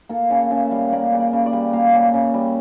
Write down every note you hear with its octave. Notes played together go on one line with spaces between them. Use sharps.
A#3 A4
C#3 C#5
C#3 E5
G3 F5
A#3 D5
C#3
D5
C#3
D5
G3
A#3 F5
C#3
C#3
G3